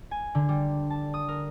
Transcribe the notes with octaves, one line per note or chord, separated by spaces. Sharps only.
G#5
D3
G3
A5
D#6
A#4